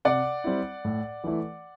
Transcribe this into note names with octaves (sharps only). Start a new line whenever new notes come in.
C3 D5 F#5
G3 C4 E4
A2
E3 A3 E4